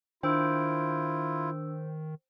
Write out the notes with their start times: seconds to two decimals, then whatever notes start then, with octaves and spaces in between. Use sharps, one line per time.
0.23 D#3 D4 E4 F4 C5 G5 E6